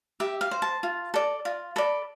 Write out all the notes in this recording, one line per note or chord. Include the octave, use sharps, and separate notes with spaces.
G4 E5
F5
C5
A5
F4
A4 D5
F4
A4 D5 B5